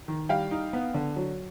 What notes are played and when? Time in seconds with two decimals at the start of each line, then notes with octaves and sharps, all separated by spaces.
0.08 D#3
0.29 G3 F5 G5
0.51 D#4
0.73 B3
0.94 D3
1.16 F#3